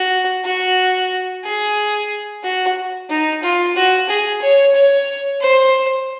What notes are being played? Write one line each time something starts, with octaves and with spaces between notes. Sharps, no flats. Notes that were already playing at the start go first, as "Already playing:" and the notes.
Already playing: F#4
F#4
G#4
F#4
D#4
F4
F#4
G#4
C#5
C#5
C5